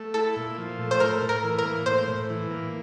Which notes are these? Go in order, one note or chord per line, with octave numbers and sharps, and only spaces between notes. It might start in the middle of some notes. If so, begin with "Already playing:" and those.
Already playing: A3
E4 A4
A#2
F3
A3
C5
A2 A#4
A2
A#4
E3
A#4
A#3
A2 C5
A2
E3
A#3